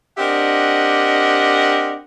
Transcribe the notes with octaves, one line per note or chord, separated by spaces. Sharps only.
C4 D4 G4 A#4 D#5 F#5